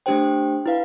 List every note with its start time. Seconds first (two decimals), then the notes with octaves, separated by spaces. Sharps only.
0.06 A3 D4 G4 C5 G5
0.66 E4 B4 F5